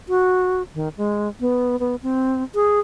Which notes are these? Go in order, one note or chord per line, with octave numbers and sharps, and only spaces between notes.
F#4
D#3
G#3
B3
B3
C4
G#4